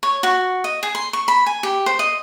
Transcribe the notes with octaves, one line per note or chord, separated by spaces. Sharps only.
C#5
F#4
D#5
G#4
C6
C#6
B5
G#5
G4
C5
D#5